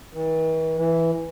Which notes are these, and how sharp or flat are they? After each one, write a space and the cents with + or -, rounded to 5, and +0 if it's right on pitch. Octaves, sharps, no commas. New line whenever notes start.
E3 -45
E3 +0